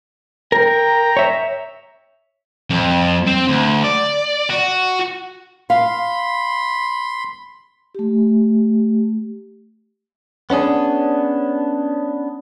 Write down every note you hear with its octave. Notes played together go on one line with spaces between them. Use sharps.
A#4 G5 A#5
C#5 E5
F2
C4
D2
D5
F#4
F5 B5 C6
A3 G4
B3 C#4 D4 G#4